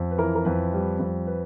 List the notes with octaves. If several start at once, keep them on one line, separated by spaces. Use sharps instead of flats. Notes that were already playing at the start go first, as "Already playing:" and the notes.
Already playing: F2
B4
E3 A#4
A#4
F2 B4
G3
F2
B4